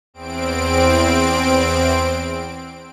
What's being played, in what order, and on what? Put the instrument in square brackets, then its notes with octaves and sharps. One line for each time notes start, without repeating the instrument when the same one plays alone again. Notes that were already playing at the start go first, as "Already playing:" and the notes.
[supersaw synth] E2 C4 D7